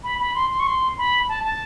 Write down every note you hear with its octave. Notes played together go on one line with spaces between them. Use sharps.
B5
B5
C6
C6
C#6
C6
B5
A5
A5